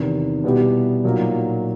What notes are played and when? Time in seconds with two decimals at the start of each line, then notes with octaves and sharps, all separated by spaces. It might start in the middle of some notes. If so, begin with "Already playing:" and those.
Already playing: E2 C3 D#3
0.44 B2 G3 B3 E4 G4
1.04 A#2 F#3 A#3 D#4